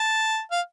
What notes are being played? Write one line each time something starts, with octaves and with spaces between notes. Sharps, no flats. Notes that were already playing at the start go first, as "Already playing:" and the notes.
Already playing: A5
F5